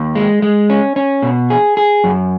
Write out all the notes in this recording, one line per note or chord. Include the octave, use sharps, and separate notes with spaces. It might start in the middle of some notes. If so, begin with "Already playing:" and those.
Already playing: D#2
G#3
G#3
C#4
C#4
B2
G#4
G#4
F#2